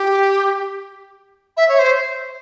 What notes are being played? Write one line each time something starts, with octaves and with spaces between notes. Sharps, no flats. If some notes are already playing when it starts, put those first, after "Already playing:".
Already playing: G4
E5
C#5
C5